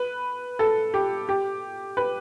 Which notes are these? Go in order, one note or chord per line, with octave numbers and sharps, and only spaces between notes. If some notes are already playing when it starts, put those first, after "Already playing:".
Already playing: B4
A4
G4
G4
B4